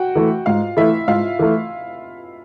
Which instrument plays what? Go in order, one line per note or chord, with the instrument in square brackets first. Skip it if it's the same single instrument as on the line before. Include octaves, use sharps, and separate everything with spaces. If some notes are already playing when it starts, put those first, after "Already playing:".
Already playing: [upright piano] F#4 F#5 G5
[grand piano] E3 A3
[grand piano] G#2 [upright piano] F4 F5
[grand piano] E3 A3 [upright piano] E4 E5
[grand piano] G#2 [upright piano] F4 F5
[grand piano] E3 A3